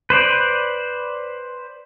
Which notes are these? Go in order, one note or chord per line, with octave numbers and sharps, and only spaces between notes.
B4 C5 D5